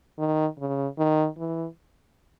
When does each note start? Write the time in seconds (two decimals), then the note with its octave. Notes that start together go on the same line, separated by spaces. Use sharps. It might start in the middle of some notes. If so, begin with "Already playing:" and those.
0.19 D#3
0.59 C#3
0.99 D#3
1.38 E3